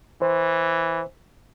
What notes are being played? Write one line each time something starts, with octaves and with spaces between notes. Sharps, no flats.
E3 C5